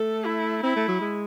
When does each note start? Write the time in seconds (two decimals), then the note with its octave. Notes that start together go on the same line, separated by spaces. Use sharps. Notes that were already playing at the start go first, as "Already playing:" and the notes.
Already playing: A3 A4
0.26 E4
0.63 C4 E4
0.76 A3
0.88 F#3
1.01 G#3